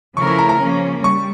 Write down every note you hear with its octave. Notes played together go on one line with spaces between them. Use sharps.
C#3 F3 A3 E4 A#4 C#6
C#6
A#5
A#5
C#3 F3 A#3 C#4
G3 C#6